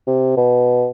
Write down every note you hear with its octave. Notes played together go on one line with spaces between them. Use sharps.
C3
B2